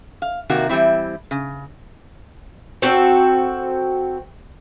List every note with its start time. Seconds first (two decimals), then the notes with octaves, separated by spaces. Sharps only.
0.22 F5
0.50 C3 D#3 A#3 F#4
0.69 E3 G3 C4 E4
1.31 C#3
2.82 C4 F#4 A4